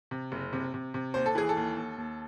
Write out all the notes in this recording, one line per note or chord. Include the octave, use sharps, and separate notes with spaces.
C3
F#1
C3
C3
C3
D#2 C5
A4
E3 G#4
A4
D#2
D#2
D#2